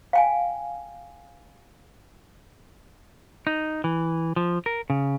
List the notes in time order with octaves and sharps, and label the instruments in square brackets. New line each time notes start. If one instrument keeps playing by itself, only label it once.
[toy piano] F5 G5 G#5
[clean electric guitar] D#4
E3
F3
A#4
C#3